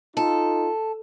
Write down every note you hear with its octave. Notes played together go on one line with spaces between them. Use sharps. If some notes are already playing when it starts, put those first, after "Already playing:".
D#4 F4 A4